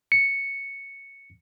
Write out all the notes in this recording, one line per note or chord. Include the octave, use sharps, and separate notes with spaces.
C#7